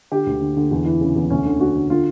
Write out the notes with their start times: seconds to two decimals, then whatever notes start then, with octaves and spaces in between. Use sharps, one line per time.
0.12 D3 G4
0.27 D2
0.41 D3
0.56 D3
0.71 E2
0.86 E3
1.01 C#3
1.16 E2
1.30 D2 C#4
1.46 D3
1.60 D3 F#4
1.76 D3
1.90 D3 F4